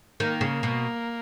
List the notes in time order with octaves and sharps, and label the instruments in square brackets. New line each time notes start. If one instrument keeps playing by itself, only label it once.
[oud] D#3 [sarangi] A#3
[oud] C#3
B2